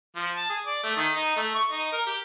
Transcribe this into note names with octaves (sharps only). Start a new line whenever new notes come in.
F3
A5
G#4
D5
A3
D#3
D#4
A3
C#6
D#4
A#4
G4